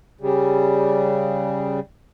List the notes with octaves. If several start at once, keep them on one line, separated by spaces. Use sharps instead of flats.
C#3 G3